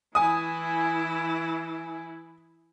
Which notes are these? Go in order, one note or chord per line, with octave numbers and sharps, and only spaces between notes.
E3 E4 G#5 D#6